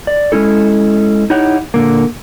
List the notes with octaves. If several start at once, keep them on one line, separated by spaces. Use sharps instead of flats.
D5
G#3 C#4 E4 A4
D#4 E4 G4 C#5 F#5
A#2 D3 A#3